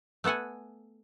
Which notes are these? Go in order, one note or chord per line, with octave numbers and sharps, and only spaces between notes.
A3 B3 A4 F#5 G#5